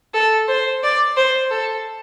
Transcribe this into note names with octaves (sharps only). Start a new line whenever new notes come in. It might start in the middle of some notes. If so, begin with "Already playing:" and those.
A4
C5
D5
C5
A4